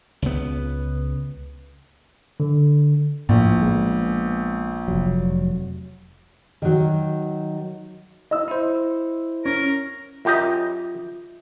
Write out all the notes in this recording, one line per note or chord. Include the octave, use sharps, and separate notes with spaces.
C#2 B3
D3
A#1 A2
G#3 A3 B3
F1 F#3
D#3 F#3
D#5 E6
E4 C5
C#4 A#4
F#2 F4 G4 D#5 E5